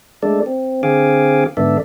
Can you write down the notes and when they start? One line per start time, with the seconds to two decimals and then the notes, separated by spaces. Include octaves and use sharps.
0.23 G#3 A3 D4 A4 D5
0.46 C4
0.83 D3 C4 G#4 F5 G#5 D6
1.57 G#2 D3 B3 A4 D5 E5